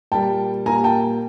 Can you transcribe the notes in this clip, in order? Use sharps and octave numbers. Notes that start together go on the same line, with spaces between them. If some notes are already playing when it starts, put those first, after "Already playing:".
A#2 G3 A#3 G5 A5
A#2 G3 A#3 G#5 A#5
G5 A5